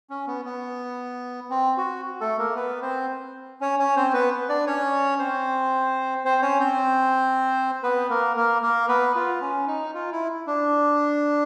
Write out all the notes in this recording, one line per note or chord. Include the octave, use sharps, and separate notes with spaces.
C#4
B3
B3
C4
F#4
A3 A4
A#3 A#4
B3 B4
C4 C5
C#4 C#5
C#4 C#5
C4 C5
B3 B4
D4 D5
C#4 C#5
C4 C5
C4 C5
C#4 C#5
C4 C5
B3 B4
A#3 A#4
A#3 A#4
A#3 A#4
B3 B4
F4
C#4
D#4
F4
E4
D4